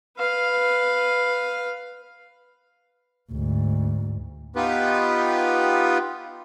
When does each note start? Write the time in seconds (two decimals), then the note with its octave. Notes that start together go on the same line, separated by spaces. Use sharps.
0.17 B4 F5
3.32 D2 G#2
4.56 B3 D#4 F4 G4 B4